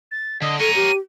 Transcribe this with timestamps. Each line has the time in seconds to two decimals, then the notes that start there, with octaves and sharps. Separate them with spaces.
0.11 A6
0.42 D3 D#5
0.59 A4 A#4 C#5 D#7
0.75 G4